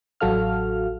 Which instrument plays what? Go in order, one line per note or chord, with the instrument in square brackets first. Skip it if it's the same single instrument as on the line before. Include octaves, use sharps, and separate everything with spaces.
[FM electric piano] A1 F#3 F#4 A4 F5 F6